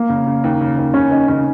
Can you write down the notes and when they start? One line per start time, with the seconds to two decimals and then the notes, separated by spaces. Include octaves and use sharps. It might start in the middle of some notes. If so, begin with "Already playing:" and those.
Already playing: A#3
0.09 C#3
0.27 C#3
0.44 D#2
0.61 C#3
0.78 D#2
0.94 C#3 C#4
1.11 D#2 D#4
1.28 C#3 C#4